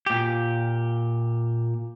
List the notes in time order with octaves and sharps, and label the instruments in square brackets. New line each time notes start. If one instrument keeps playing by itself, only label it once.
[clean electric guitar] A#2 G4